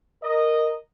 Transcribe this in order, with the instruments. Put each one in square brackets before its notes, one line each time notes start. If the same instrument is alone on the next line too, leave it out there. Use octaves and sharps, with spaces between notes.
[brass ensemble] A#4 D#5